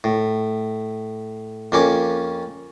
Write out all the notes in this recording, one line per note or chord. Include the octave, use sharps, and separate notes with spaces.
A2
F2 A#3 C#4 D6